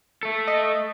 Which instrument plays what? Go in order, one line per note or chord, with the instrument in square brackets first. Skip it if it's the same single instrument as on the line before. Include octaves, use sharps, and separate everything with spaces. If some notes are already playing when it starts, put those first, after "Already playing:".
[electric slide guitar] A3 A4
[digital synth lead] D#5